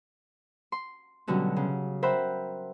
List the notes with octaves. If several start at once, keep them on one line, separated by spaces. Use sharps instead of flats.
C6
B2 D3 F#3 G3 C#4
C#3
A#4 C5 E5 F#5 G5 B5